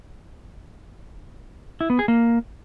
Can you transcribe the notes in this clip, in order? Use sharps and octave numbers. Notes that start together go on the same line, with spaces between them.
E4
B3
G#4
A#3